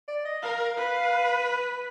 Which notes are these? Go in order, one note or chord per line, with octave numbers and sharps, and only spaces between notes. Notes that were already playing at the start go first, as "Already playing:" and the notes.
D5
D#5
A#4 F5
B4